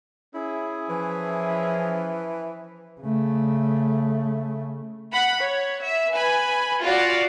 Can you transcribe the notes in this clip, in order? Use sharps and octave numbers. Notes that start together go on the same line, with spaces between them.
C#4 E4 G#4
E3 F3
C#3 A3
F#5 B5
C#5
E5
B4 G#5 B5
F4 F#4 D5 F5